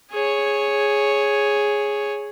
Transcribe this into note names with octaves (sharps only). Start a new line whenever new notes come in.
G#4 C#5